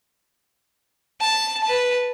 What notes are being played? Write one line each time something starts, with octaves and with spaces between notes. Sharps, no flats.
A5
B4 A5